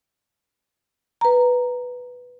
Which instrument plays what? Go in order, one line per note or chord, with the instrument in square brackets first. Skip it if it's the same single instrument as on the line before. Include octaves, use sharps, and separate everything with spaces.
[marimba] B4 A#5